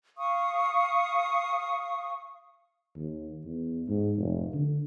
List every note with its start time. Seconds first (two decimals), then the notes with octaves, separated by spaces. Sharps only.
0.18 F5 C#6 D#6
2.97 D#2
3.45 E2
3.88 G#2
4.18 F1
4.54 D3